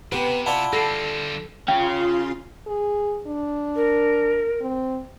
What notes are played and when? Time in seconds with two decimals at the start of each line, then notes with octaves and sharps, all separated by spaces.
0.12 C3 B3 G4 B4
0.46 E4 F4 D5 F#5 A5 B5
0.73 D3 G3 A4 A#6 C7
1.68 C#4 F4 F5 G5 C6
2.66 G#4
3.27 D4
3.76 A#4
4.61 C4